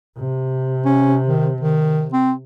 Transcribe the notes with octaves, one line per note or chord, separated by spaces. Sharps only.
C3
C#4
D#3
D#3
C4